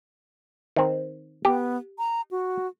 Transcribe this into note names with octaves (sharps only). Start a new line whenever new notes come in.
D#3 C4
B3 G4
A#5
F#4